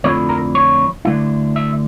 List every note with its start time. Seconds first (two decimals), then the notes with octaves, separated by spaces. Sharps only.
0.04 F2 D3 F3 A3 E4 C#5
0.29 A#4
0.55 C#5
1.05 D2 D3 A3 E4
1.56 E5